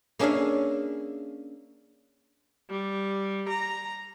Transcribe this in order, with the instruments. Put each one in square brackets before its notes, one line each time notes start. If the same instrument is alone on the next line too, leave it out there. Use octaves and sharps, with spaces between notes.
[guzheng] A#3 C#4 D4 G#4 E5 F5
[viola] G3
A#5